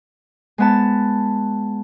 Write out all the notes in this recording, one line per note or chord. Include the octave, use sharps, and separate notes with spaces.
G#3 B3 A5